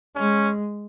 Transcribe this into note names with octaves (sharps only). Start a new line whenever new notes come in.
G#3 C#4